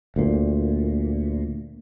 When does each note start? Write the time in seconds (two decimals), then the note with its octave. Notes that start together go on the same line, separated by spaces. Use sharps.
0.16 D2 A#2